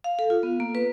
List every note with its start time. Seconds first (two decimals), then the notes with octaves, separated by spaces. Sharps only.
0.04 F5
0.19 A4
0.30 F4
0.43 B3
0.60 A#3
0.75 B4